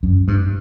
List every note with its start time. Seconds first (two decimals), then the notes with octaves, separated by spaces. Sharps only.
0.03 F#2
0.28 G2